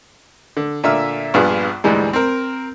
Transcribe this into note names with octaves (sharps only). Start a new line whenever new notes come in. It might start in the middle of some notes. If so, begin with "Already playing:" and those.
D3
A#2 D3 E5 E6 F6
A#1 G2 B3 F4 G#4
D2 G#2 E3 G3 G#3
C4 A#4